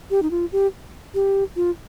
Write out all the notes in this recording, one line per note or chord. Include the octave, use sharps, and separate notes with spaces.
G4
D#4
F4
G4
G4
F4